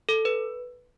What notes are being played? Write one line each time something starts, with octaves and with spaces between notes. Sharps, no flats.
A4
B4